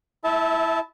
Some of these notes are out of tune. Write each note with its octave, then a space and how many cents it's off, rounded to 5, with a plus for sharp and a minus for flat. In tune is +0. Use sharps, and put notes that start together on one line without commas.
E4 +0 E5 -30 A5 -15